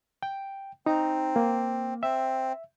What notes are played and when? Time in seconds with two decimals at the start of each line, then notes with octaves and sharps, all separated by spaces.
0.23 G5
0.86 C4 D#4 A#5
1.36 A#3
2.03 C4 E5